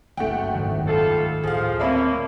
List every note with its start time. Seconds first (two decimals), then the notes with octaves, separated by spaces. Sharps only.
0.17 F#1 C#2 A3 F#5 G5
0.55 G#2 D#3
0.87 G3 F4 A4
1.44 D2 A2 F3 G#4 F5
1.80 A#3 C4 C#4 D5 E5 A5 B5